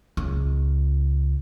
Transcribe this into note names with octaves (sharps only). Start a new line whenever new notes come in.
C#2